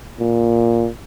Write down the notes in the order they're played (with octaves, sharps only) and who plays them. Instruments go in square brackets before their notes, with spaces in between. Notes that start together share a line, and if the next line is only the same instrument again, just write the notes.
[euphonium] A#2